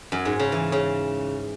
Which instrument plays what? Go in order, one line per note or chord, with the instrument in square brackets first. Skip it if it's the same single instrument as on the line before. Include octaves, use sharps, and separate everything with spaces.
[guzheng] F#2
G#2
C#3
E3
C#3